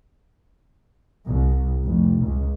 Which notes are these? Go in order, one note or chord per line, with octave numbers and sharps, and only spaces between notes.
C2
F1
C#2